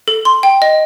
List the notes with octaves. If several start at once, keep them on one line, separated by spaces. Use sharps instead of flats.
A4
C6
G5
D#5